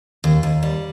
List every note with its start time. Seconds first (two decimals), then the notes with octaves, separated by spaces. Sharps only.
0.24 D#2
0.43 D#2
0.63 G3